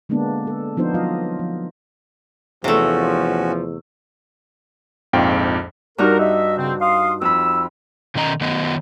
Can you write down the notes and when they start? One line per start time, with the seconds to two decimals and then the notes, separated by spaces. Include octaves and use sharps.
0.09 D3 G#3 A#3 B3 D4
0.47 A4
0.77 F3 B3 D4 D#4 F4 C5
0.94 F#3 F4 D#5 F5
1.39 F3
2.64 E2 C3 F3 A3 C#4 F#4
5.13 A#1 F2 G#2 F4 G5
5.98 G2 D#4 F#4 A#4
6.19 D#5 E5
6.57 C#3 C4
6.80 F5 C6 D#6
7.21 F2 B5 E6
8.15 B2 D#3 C#4 D#5 A#5
8.41 D#3 F#3 B3 D#5